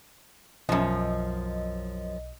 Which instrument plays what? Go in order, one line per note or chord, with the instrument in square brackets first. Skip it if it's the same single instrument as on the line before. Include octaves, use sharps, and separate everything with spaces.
[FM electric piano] B1 D#5 [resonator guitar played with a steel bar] F#2 F3